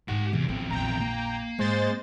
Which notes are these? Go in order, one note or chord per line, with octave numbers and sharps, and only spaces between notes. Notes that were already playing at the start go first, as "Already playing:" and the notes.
G#2 G#3 G4 F#5
E2 C3
A1 E2 C4
A#1 F2 G5 A#5
A#3
G#2 G#3 C5 A6